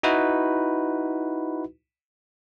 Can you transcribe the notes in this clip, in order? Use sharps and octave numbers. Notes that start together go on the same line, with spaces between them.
D#4 E4 F#4 B4